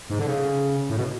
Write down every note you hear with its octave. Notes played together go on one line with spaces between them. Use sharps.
G#2
D3
C#3
A2
B2